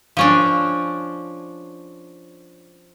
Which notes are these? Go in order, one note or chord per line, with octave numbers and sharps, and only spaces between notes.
F3 C#4 D4